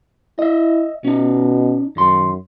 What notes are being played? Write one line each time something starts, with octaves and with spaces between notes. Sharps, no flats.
E4 D#5 E5
B2 C#4 D#4
F#2 D#3 C6